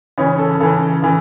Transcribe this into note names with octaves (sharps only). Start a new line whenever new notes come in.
C#3 E3 C#5
A4
C#3 E3 A4
C#3 E3